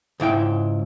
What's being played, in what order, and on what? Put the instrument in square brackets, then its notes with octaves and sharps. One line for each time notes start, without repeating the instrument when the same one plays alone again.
[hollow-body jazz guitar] C#2 G#2 E4 G5